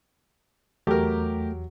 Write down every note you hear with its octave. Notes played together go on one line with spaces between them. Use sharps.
E2 F#3 A3 G4 A#4